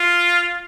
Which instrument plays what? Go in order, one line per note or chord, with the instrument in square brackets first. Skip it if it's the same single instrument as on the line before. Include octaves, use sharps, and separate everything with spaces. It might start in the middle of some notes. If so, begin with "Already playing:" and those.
Already playing: [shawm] F4